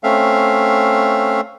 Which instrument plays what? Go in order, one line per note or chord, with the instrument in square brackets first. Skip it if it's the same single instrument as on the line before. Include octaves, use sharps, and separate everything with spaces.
[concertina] A3 C4 C#4 E5 F5